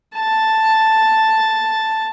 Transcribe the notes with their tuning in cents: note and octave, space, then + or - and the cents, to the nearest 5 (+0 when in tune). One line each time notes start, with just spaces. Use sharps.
A5 +0